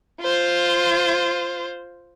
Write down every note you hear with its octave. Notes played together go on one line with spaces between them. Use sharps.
F4 C5